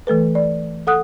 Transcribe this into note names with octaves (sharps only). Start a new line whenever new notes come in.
E3 A3 A4 B4
D5
A4 F#5 D#6 F#6